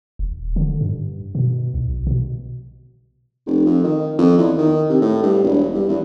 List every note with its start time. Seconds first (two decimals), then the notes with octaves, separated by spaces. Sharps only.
0.19 D#1
0.56 D3
0.81 G2
1.35 B2
1.74 B1
2.07 B2
3.46 F1
3.66 F2
3.84 D#3
4.18 F2
4.38 E2
4.58 D#3
4.89 C3
5.01 A2
5.23 G2
5.44 E1
5.74 G2
5.89 E2